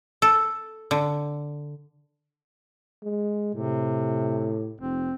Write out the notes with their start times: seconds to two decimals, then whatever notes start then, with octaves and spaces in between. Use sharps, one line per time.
0.22 A4
0.91 D3
3.03 G#3
3.55 A2 C3
4.80 F1 C4